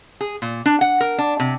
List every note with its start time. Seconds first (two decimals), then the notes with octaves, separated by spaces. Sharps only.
0.21 G#4
0.42 A#2
0.66 D4
0.81 F#5
1.00 A#4
1.18 D4
1.40 C3